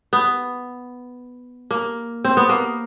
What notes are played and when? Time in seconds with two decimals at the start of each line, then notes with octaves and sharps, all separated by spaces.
0.13 B3
1.71 A#3
2.25 C4
2.37 B3
2.49 A#3